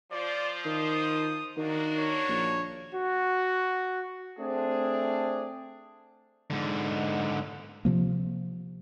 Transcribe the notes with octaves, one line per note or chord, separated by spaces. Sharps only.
F3 F4 C5 D5
D#3 D#6
D#3 A#3 D4 F#4
C#5
A#1
F#4
A3 C4 D4 G#4
G#2 D3
C3 F3 A#3